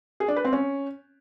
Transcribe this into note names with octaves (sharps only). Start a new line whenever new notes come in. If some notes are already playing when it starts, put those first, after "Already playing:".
G#4
D4
B4
C4
C#4